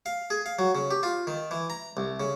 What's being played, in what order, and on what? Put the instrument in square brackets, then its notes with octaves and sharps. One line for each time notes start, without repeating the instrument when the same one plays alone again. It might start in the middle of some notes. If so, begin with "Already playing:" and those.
[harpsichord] F5
G#4
F5
F#3
C#3
G4
F4
D#3
E3
A#5
C2
C#3